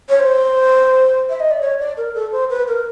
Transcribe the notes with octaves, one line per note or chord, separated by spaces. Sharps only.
C#5
C5
E5
D#5
D5
C#5
D5
A#4
A4
C5
B4
A#4